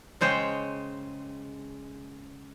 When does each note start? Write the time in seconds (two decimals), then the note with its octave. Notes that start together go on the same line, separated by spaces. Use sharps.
0.21 C#3 G#3 C5 C#5 G5